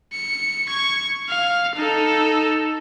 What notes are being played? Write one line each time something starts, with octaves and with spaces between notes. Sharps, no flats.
C#7
C#6 G#6
F5
D#4 A4